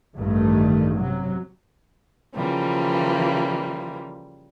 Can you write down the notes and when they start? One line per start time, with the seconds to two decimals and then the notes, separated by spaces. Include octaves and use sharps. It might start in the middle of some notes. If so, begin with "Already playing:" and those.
0.17 A1 G2 D#3 A3
0.96 C3 F#3
2.35 C#3 E3 F3 G3 A#3